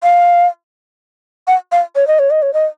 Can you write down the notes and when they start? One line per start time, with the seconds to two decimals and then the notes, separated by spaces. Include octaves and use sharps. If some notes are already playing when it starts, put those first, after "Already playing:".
0.03 F5
1.47 F#5
1.72 F5
1.96 C#5
2.07 D#5
2.19 C#5
2.31 D#5
2.42 C#5
2.53 D#5